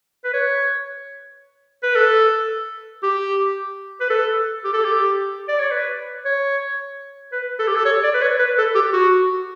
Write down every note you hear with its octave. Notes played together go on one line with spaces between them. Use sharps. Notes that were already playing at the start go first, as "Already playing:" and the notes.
B4
C#5
B4
A4
G4
B4
A4
G4
A4
G4
D5
C#5
B4
C#5
B4
A4
G4
A4
C#5
D5
B4
C#5
B4
A4
G4
F#4